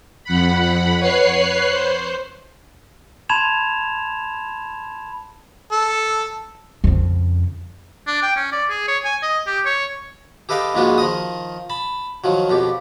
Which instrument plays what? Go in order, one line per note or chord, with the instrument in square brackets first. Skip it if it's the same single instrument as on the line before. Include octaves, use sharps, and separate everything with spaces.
[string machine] F2 F#5 B5
B4 C#5 F#6 C7
C5
[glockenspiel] A5 B5 C6 G#6 E7 F7
[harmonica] A4
[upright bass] F2 C#3
[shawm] D4
G5
C#4
D5
G#4
C#5
G#5
D#5
G4
C#5
[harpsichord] G4 A4 B4 D#5 F5 G5
A#1 G#2 G#3 F4 F#4 B4
D#3 F3 D#5 D#6
A5 B5
D#3 F3 F#3
F2 B2 G4